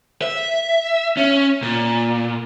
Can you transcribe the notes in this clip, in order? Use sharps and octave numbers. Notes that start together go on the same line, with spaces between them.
E5
C#4
A#2